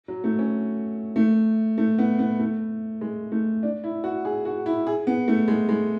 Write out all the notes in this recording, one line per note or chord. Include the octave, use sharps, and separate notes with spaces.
F#3
A3
C#4
A3
A3
B3
B3
A3
G#3
A3
D4
E4
F#4
G#4
F#4
E4
G#4
B3
A3
G#3
G#3